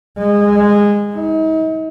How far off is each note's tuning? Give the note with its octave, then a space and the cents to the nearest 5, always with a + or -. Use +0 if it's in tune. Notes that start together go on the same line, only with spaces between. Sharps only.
G#3 -20
D#4 +40